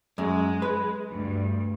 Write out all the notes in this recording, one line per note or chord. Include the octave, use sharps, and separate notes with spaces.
F#2 G#3
B4
D2 G2